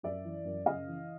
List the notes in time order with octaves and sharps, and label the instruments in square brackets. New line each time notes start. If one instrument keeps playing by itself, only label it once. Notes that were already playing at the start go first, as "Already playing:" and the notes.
[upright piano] F#2 D5 E5
E3
F#2
C#3 D#5 F5
E3